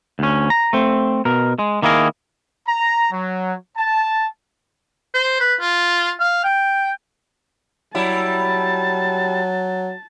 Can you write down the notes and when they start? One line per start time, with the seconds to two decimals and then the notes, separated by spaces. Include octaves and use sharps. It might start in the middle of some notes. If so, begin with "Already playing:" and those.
0.19 D2 C#4
0.50 A#5
0.73 A3 C4
1.25 B2 A#4
1.59 G#3
1.82 D#3 A#3 E4 G#4 A#4
2.67 A#5
3.12 F#3
3.77 A5
5.14 C5
5.40 B4
5.61 F4
6.20 F5
6.44 G5
7.95 F#3 G3 E4 A5